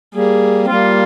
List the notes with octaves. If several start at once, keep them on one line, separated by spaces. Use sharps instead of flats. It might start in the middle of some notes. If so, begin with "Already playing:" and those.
G3 A#3 G#4
C4
G3 A#3 F4